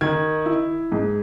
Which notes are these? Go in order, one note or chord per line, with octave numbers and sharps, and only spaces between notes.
D#3 G#6
E4
G#2